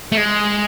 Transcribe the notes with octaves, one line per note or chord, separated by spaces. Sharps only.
A3
G#3